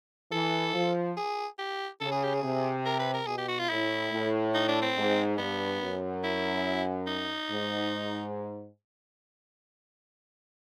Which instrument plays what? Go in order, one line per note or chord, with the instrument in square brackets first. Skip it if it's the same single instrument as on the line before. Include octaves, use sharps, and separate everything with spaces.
[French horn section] E3 [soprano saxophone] A4
[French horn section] F3
[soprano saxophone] G#4
G4
[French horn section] C#3 [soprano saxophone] A4
[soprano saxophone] G#4
G4
G#4
[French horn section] C3
[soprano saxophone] A#4
B4
A#4
[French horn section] B2 [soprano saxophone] G#4
[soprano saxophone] G4
F#4
F4
[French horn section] A2 [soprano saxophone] E4
[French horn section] A2
[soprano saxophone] D#4
D4
C4
[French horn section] G#2
[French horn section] G2 [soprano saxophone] B3
[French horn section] F#2
[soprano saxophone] E4
D#4
[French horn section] G#2